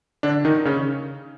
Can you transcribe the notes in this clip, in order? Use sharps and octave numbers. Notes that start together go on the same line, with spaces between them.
D3 D4
D#3 D#4
C#3 C#4